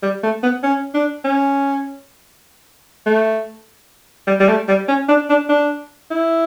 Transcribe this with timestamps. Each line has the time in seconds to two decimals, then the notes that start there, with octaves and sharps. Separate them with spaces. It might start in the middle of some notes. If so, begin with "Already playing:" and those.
0.03 G3
0.24 A3
0.43 B3
0.63 C#4
0.94 D4
1.24 C#4
3.06 A3
4.28 G3
4.40 G3
4.49 A3
4.68 G3
4.88 C#4
5.09 D4
5.30 D4
5.49 D4
6.11 E4